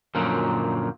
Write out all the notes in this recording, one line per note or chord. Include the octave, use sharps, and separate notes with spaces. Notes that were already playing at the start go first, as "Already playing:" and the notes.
F#2 A#2 D3 F3 F#3